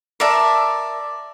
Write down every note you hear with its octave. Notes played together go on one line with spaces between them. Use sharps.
A#4 D5 E5 A5